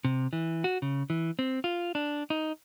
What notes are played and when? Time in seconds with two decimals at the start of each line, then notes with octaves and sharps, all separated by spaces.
0.05 C3
0.33 E3
0.64 F#4
0.82 C#3
1.10 E3
1.39 C4
1.64 F4
1.95 D4
2.30 D#4